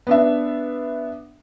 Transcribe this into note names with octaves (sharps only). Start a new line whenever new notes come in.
B3 D4 E5